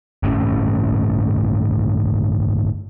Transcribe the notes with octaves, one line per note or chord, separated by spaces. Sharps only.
G1 A2 C4 C#4